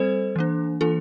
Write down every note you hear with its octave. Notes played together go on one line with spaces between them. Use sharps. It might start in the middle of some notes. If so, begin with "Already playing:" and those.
Already playing: G3 C4 A4 C5
E3 A#3 D4
E3 A#3 D4 F4 A4